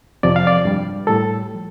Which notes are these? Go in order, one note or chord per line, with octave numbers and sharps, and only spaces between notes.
F2 C3 F3 D5
F5
D5
G2 G3
A2 G3 A4
F3